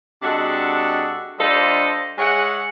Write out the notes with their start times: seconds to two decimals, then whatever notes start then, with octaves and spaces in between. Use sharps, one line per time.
0.23 C3 G#3 D4 F#4 A4
1.39 G3 D4 F4 A4 C5 D#5
2.19 G#3 G#4 C#5 E5 F#5